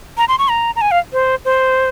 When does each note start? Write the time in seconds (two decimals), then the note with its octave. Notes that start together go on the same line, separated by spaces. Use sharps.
0.18 A#5
0.28 C6
0.39 C#6
0.49 A#5
0.76 A#5
0.81 G#5
0.91 F5
1.13 C5
1.45 C5